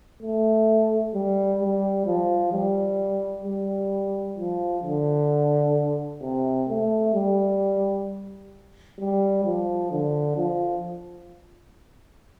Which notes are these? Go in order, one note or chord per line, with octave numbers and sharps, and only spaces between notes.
A3
G3
G3
F3
G3
G3
F3
D3
C3
A3
G3
G3
F3
D3
F3